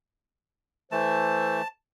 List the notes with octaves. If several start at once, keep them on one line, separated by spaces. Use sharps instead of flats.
E3 A3 C5 A5